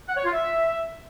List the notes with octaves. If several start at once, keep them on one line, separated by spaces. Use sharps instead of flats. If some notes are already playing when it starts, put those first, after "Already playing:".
F#5
C#5
F4
E5